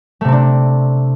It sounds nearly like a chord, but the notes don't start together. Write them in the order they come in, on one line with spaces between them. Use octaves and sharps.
A3 C3 C4 D4